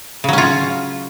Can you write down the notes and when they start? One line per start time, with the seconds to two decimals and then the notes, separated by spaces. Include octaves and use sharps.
0.24 C#3
0.29 F#3
0.33 C#4
0.38 F4